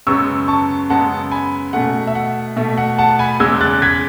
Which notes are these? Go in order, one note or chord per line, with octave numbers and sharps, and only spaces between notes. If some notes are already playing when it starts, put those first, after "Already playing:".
F#2 C#3 G#3 B3 C#6 E6
A5 C#6
F#2 C#3 G#3 B3 F#5 A5
G#5 B5
B2 A3 F#5
E5
F#5
B2 A3 E5
F#5
F#5 A5
G#5 B5
E2 C#3 G#3 E6 G#6
F#6 A6
G#6 B6